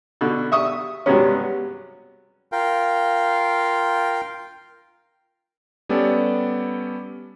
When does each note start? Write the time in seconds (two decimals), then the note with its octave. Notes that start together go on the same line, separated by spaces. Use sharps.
0.21 B2 D3
0.52 E5 C#6 D#6
1.06 G2 C3 F#3 G#3 B3 C#4
2.52 F4 A#4 F5 G5
5.89 G3 B3 C#4 G4 A4 D5